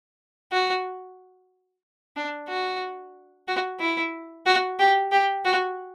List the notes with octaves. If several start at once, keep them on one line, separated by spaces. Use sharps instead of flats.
F#4
D4
F#4
F#4
E4
F#4
G4
G4
F#4